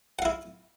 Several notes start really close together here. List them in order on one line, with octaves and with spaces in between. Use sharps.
F#5 F5 E4